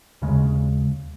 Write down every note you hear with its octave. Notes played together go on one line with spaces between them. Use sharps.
D#2 C#3 G#3